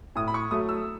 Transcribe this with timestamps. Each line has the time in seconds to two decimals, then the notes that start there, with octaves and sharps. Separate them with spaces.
0.16 A2 D#6
0.28 B5
0.34 C#6
0.51 F#3 A3 D#6
0.69 E6